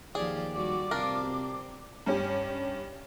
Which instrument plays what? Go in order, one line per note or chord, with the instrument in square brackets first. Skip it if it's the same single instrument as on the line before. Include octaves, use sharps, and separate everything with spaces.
[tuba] D#2 [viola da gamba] F3 G4 D5 [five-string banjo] G#4
[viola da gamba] G3 F#4 D5 [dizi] D6
[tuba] C3 [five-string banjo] D4 A#4 [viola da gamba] F4
[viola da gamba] C4
[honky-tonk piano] G2 C#4 G4